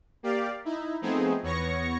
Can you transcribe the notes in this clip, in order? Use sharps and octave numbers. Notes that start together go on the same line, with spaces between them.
A#3 G4 D5 F5
D#4 E4
F3 A3 B3 C4 D#4 G#4
E2 B3 C#5 C#6 A#6 C#7